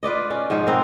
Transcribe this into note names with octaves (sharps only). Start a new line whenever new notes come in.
F4 B4 D5 D#5
C#4 D5
G#2 F3 D#4 G#4
B3 C4 A#4